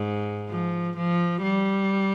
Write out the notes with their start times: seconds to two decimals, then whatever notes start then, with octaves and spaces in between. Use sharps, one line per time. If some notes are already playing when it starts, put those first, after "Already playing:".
Already playing: G#2
0.49 F3
0.97 F3
1.43 G3